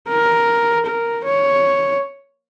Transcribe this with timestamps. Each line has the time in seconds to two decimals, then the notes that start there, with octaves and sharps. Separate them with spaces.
0.08 A#4
0.86 A#4
1.25 C#5